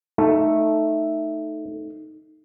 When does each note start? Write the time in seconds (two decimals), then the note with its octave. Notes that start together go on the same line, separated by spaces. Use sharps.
0.18 A3 D#4